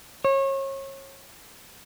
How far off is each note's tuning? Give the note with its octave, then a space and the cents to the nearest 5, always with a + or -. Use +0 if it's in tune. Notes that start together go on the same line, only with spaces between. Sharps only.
C#5 -30